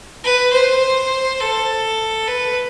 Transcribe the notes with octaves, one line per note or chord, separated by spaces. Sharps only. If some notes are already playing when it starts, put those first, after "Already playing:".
B4
C5
A4
B4